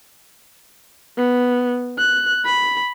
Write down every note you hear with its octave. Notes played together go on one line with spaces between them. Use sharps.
B3
F#6
B5